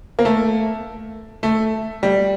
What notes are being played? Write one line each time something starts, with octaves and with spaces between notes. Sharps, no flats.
A#3
A3
A3
G3